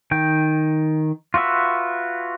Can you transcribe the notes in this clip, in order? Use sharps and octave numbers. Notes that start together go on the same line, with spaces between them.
D#3 G5
F4 F#4 B4 E5